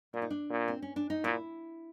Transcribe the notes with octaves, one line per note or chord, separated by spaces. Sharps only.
A#2 D4
D#4
D4
A#2
C4
C#4
D4
D#4
A#2 E4